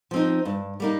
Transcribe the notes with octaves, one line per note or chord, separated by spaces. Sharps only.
F3 C4 D#4
G2
G3 A#3 D#4